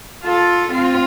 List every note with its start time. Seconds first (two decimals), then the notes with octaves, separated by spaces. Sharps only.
0.24 F4 A4
0.73 C4 F4